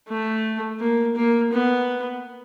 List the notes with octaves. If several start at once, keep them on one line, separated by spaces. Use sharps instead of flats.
A3
A#3
A#3
B3